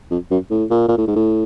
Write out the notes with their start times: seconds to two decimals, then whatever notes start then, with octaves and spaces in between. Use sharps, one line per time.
0.11 F2
0.31 F#2
0.51 A2
0.70 A#2
0.89 A#2
0.98 A2
1.08 G#2
1.16 A2